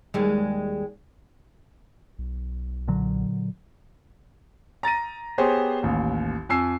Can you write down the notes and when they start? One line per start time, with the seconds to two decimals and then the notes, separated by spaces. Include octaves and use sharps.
0.14 D#2 G3 G#3
2.19 B1
2.88 A#2 D3 F#3
4.83 A#5 A6 A#6 D#7
5.38 B3 G4 G#4 C5 C#5
5.82 A1 D#2
6.49 F2 G#5 E6 C7